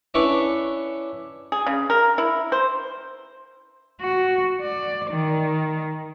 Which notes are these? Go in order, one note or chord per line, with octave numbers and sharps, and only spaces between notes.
C#4 D4 E4 B4 E5 C#6
G#4
C#3
A#4
E4
C5
F#4
D5
D#3